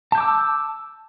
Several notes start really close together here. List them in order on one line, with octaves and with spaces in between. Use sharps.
A5 G6 D6 E6